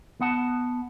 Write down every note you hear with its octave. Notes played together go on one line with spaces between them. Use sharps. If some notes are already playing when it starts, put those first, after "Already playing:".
B3 F#5 A5